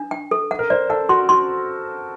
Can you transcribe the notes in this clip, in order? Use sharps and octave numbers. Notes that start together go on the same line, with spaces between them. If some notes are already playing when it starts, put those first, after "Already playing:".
Already playing: D4
G5
A4
F#5
A#4
C5 D5
A4 F#5
F#4 C6
F#4 C6